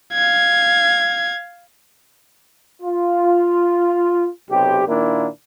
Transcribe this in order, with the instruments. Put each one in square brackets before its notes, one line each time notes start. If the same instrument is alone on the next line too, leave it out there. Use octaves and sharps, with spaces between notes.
[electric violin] F5 G#6
[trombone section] F4
B1 C3 G4
A#2 D#3 A#3 D4 E4